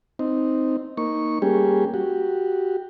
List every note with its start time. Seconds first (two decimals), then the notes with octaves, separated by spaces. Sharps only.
0.19 C4 D#4
0.97 A#3 D#4 C#6
1.42 G3 A#3 C#4 G4 G#4
1.94 F#4 G4